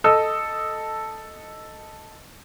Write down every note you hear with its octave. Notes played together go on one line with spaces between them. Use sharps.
A4 D#5 D#6 E6